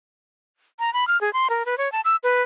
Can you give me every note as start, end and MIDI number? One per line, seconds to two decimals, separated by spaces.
0.79 0.93 82
0.94 1.07 83
1.08 1.20 89
1.21 1.32 68
1.33 1.48 84
1.50 1.65 70
1.66 1.78 71
1.78 1.91 73
1.92 2.01 81
2.05 2.16 88
2.23 2.42 71